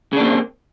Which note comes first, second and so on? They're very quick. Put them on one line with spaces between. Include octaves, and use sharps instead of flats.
C#3 D4 A#3 C4